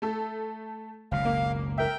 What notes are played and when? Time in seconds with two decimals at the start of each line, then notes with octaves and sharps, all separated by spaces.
0.02 A3 A4
1.11 F#1 C#2 B2 F5
1.25 A#3
1.78 A#4 E5 G5